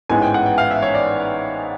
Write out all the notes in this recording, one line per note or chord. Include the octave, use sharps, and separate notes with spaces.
A1 G#2 E3 G#3 B3 G#5
G5
F#5
G5
F5
E5
C#5
D5